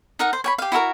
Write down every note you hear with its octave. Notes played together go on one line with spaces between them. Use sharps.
D#4 A#4 F#5
C5
C#5 G5 B5
G4 F5
E4 F#4 A4 A#4